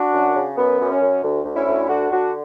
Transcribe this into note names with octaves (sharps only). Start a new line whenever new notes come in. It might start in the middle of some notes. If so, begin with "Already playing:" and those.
Already playing: D4 F#4
F#2
C#3
F#2 B3
F#2
C#4
F#2
D2
D2
C#4 E4
D2
D3 D4 F#4
D3 D4 F#4